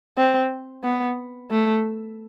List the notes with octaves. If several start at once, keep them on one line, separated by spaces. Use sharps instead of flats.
C4
B3
A3